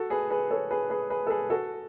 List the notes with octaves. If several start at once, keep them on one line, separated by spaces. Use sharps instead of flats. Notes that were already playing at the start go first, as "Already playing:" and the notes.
Already playing: F#4 A4
G#4 B4
G#4 B4
A4 C#5
G#4 B4
G#4 B4
G#4 B4
A4
G#4 B4
F#4 A4